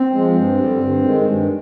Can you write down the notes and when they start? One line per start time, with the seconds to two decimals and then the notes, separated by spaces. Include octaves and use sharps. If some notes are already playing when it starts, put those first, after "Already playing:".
Already playing: C4
0.13 F3 G#3
0.36 G2
0.58 D3 G3
0.80 G2
1.02 D#3 G#3
1.25 G2